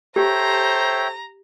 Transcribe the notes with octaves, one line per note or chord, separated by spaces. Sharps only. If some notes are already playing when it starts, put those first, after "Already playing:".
G4 A4 C5 C#5 E5 G5 A#5